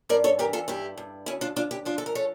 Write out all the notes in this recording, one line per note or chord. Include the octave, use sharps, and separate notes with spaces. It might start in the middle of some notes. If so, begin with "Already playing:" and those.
G2 A#4 D5
A4 C#5
E3 G4 A#4
F4 A4
G2 E4 G4
G2
D2 C#4 E4
D4 F4
D2 D4 F4
E4 G4
F3 D4 F4
A4
A#4
A4 C#5